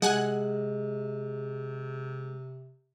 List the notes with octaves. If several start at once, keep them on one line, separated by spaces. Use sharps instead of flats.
C3 G#3 F#5 G#5 F#6